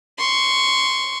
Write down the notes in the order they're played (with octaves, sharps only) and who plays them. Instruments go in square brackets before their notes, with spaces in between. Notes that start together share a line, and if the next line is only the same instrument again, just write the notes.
[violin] C6 C#6